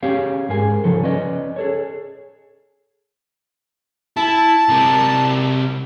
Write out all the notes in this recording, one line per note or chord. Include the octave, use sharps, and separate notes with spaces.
C#4 G4 G#4 C#5 F5
G#2 G#4 A#4 G#5
C#3 F3 D#4 A4
C#4 B4 D5 D#5
G#4 A4 C#5
E4 A5
C3 A#4